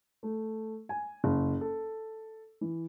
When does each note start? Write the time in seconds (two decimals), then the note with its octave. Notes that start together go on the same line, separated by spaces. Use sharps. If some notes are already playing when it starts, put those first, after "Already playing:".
0.23 A3
0.89 G#5
1.24 F#1
1.61 A4
2.61 E3